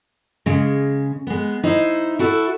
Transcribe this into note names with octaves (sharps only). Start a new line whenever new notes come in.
C#3 G#3
G#3 B3
D#4 E4 C5
E4 F#4 A4